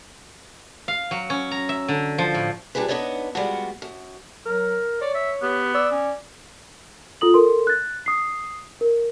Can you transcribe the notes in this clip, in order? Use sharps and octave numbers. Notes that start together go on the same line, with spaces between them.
F5
F#3
C#4
A#5
E5
D3
F3
A2
G3 D4 F4 G#4 B4
B3 D4 D#4 B4 C#5 D5
G3 G#3 B3 F4 F#4
F#2
F#3 A#4
C#5 D5
E5
B3 G4
D5 E6
C#4
F4 A4 D#6 F#7
A4 A#4 C6
F#6 A6
D#6 C7
A#4